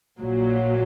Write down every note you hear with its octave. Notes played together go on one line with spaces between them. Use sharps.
A#1 A#2 F#3